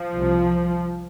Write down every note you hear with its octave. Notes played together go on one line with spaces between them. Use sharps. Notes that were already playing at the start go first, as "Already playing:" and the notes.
Already playing: F3
C2 C3